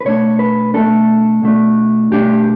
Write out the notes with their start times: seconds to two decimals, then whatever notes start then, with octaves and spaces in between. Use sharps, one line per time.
0.01 B4
0.05 B2 A3 D4 C#5
0.39 B4
0.74 B2 A3 D4 A4
1.43 B2 A3 D4
2.11 B2 A3 D4 G4